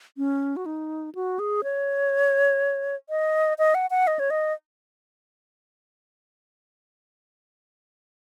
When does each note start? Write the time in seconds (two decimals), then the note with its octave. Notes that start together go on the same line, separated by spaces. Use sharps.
0.18 C#4
0.56 F#4
0.66 D#4
1.15 F#4
1.39 G#4
1.64 C#5
3.10 D#5
3.59 D#5
3.75 F#5
3.90 F#5
4.07 D#5
4.19 C#5
4.30 D#5